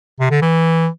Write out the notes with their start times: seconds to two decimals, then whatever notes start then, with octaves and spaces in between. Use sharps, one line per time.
0.21 C3
0.31 D3
0.42 E3